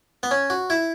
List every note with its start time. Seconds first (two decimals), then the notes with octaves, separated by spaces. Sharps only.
0.23 B3
0.31 C#4
0.50 F#4
0.70 E4